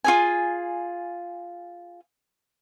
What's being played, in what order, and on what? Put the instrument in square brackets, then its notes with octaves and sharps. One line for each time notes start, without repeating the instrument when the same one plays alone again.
[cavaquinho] F4 G#4 G#5